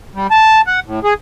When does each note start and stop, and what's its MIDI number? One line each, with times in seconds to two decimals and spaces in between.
0.15 0.27 55
0.31 0.61 81
0.67 0.80 78
0.86 1.00 45
1.04 1.14 68